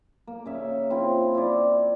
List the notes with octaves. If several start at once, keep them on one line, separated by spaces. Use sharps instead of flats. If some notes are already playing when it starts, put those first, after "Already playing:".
A#3
C#3 E5
C4 E4 F4
E4 D5